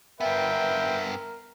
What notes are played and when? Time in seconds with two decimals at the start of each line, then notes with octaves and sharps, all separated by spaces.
0.20 G2 B3 A#4 B4 E5 F5 G5